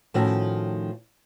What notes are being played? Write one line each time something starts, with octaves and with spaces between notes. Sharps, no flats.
A2 D#3 F3 A3 C#4 F#4